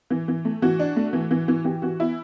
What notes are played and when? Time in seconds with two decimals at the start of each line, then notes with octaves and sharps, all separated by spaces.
0.10 E3
0.28 E3
0.45 A3
0.62 E3 F#4
0.79 D4
0.96 A3
1.13 E3
1.31 E3
1.48 E3
1.65 E3 G4
1.82 E3 F#4
2.00 B3 E4